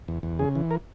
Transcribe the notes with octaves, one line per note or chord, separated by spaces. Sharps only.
E2
E2
C#3 G#4
E3
A#4